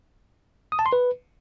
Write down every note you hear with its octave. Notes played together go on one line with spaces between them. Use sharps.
D#6
A5
C6
B4